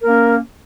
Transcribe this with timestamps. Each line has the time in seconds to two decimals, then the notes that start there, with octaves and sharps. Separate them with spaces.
0.01 A#4
0.05 A#3
0.09 C#4